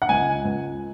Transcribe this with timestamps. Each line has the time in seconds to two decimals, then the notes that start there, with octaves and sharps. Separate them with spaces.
0.02 F#5
0.09 C#2 G#5
0.45 C#2